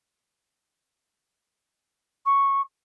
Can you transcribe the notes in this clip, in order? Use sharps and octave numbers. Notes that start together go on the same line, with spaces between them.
C#6